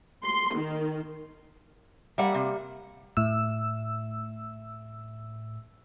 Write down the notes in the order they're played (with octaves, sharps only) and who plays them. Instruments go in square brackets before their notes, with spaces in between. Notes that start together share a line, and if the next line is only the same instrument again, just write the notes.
[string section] C6
D#3
[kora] G3 A#3 [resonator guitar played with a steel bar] E5 F#5
[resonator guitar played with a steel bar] C3
[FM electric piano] A2 E6